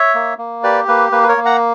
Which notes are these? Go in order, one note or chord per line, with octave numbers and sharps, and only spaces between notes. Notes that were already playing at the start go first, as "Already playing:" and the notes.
Already playing: C#5 E5
A#3
A#3
G4 B4 D5
A#3 B4
A#3 B4
B4
A#4 C#5
A#3
F#5 A#5